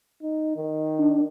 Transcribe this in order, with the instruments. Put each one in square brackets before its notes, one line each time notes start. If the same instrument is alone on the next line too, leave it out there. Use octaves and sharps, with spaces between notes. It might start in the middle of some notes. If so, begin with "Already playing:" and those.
[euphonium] D#4
D#3
[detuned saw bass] D4